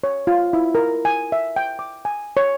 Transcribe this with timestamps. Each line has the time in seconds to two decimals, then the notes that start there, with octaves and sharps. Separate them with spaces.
0.04 C#5
0.27 F4
0.53 E4
0.75 A#4
1.05 G#5
1.32 E5
1.56 G5
1.79 D6
2.05 G#5
2.37 C#5